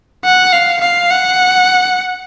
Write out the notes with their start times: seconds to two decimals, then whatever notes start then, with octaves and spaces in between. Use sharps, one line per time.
0.25 F#5
0.53 F5
0.81 F5
1.10 F#5